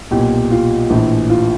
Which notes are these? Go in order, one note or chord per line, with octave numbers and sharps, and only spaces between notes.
B1 A#2 G4
F4
A#1 A2 E3
F4